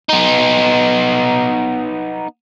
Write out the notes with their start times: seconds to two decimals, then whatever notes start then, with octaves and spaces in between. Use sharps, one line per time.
0.09 B3 D#4